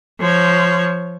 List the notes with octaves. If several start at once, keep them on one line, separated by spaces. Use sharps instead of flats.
F3 C#5